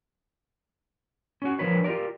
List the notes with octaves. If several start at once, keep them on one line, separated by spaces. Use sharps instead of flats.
C#4 F#4
F3 D4 A#4 B4 C#5
F4 G4 A#4 D5